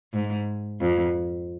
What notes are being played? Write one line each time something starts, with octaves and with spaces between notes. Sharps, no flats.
G#2
F2